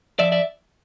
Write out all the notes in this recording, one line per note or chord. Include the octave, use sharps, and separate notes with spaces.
F3 D5 E5
D5 E5